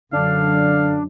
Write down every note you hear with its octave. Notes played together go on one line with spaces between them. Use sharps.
F#2 D3 D4 F5